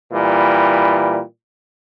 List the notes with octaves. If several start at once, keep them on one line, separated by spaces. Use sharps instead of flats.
A#2 E3 G3